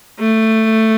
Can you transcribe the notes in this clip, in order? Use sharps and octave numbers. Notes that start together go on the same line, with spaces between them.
A3